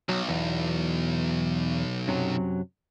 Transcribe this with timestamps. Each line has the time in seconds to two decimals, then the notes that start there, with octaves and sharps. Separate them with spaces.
0.09 B1 F#3
0.29 E2
2.08 F#2 C3 F#3